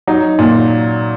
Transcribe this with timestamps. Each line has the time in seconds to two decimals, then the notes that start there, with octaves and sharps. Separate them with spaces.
0.07 F#3 D#4
0.39 A#2